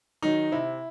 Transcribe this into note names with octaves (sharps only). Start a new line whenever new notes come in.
D#3 F#3 D#4
C3 E4